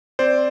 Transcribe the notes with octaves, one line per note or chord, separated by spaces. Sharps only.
C4 C5 D5